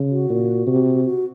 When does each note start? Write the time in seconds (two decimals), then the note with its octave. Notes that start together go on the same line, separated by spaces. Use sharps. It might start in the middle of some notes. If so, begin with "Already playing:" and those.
Already playing: C#3
0.11 F#4
0.30 A#2
0.67 C3
1.05 F#4